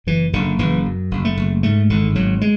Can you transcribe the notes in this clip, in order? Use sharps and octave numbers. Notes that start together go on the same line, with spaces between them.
F#1 E3
F#1 D3
F#1 E3
F#2
F#1
A3
F#1
G#2 A3
G#1 D3
G#1 F#3
G#3